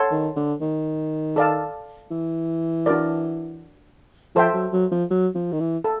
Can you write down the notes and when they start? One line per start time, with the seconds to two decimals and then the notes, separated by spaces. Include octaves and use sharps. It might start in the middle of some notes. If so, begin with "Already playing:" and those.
Already playing: A4 C#5 F#5 A5 C6
0.11 D#3
0.36 D3
0.61 D#3
1.36 A4 D5 F5 A5
2.11 E3
2.86 D4 F#4 A#4 D5
4.35 F3 A4 C5 E5 G5
4.54 F#3
4.73 F#3
4.92 F3
5.10 F#3
5.35 F3
5.52 D#3
5.60 E3
5.84 A4